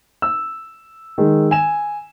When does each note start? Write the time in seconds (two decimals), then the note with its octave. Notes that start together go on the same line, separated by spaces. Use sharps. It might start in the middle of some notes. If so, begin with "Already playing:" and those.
0.22 E6
1.18 D#3 G#3
1.51 G#5 E7